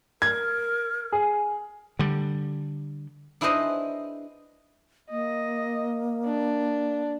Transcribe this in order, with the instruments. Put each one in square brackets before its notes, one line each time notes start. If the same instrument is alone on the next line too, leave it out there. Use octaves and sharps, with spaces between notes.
[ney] A#4 [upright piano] G#6
[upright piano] G#4
[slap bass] D3 G3
[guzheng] D4 E4 G#4 B4 C5 D#5
[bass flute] A#3 [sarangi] D#5
[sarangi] D4